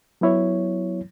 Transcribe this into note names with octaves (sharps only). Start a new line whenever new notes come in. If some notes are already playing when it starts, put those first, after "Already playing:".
F#3 B3 E4 C#5